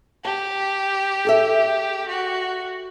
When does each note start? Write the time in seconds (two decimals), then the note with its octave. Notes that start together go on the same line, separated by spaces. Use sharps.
0.25 G4 A5
1.25 G#4 A4 E5
2.09 F#4